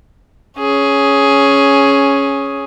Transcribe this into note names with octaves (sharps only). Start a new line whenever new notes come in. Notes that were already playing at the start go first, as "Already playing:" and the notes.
C#4 G#4